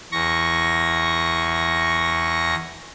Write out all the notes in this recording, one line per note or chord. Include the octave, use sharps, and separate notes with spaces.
E2 C#6 A#6